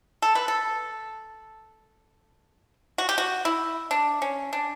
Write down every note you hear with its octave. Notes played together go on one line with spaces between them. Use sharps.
A4
B4
A4
F#4
G4
F#4
E4
D4
C#4
D4